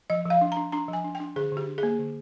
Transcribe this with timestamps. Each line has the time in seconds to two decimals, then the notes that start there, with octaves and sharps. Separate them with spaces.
0.10 F3 D#5
0.26 F3 F5
0.41 D4
0.52 A#5
0.57 D4
0.72 D4 A#5
0.88 F3
0.93 G#5
1.04 D4
1.15 G5
1.20 D4
1.36 D3 G#4
1.52 D3
1.57 G4
1.67 D4
1.78 G#4
1.83 A#3
1.99 D3